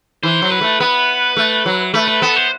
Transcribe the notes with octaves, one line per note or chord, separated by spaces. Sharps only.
E3 C5
F#3
B4
A3
B3 B4
A3
F#3
A3 B4
B4
B3 A4
C5